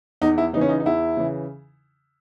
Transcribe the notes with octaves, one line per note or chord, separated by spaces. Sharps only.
E2 D#4
E4
C#3 E3 C#4 D#4
D#4
D#4
E2 E4
C#3 E3